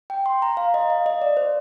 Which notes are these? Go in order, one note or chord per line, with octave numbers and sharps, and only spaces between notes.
G5
C6
A#5
F5
D#5
F5
D#5
D5
C5